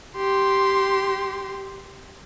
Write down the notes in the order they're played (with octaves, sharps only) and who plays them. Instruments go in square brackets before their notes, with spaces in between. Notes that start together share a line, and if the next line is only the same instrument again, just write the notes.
[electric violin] G4 C6